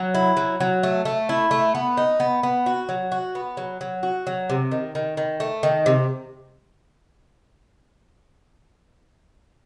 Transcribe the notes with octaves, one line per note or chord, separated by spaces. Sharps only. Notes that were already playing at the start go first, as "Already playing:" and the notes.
Already playing: F#3
E4
F#3
F#3
A3
A3
E4
A3
B3
D#4
B3
B3
F#4
F#3
F#4
B3
F#3
F#3
F#4
F#3
C3
D#3
D#3
D#3
A3
D#3
C3